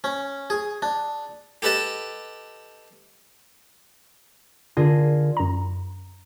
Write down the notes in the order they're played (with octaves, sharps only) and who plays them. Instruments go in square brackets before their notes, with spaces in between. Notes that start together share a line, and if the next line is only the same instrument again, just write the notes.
[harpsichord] C#4
G#4
D4
G4 A4 B4 D#5 A5
[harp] D3 F4 G#4 A#4
[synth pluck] F#2 A#5